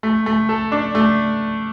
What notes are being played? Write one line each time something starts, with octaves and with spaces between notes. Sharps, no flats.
A3
A3
A4
D4
A3